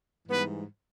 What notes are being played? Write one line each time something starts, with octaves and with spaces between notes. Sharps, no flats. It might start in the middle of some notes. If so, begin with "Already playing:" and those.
G#2 E3 G3 B3 B4